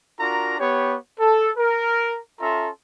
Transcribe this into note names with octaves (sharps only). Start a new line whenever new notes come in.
D4 F4 F#4 A#4 A#5
B3 G4 C#5
A4
A#4
C#4 F4 A4 E5 A#5 C6